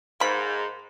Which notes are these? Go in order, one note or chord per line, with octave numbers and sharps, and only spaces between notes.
G#2 A#3 B5